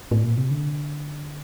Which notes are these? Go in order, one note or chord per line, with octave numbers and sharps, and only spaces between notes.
A2
A#2
C3
D3